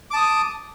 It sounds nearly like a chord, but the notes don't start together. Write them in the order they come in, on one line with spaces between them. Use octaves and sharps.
D6 A5 D#6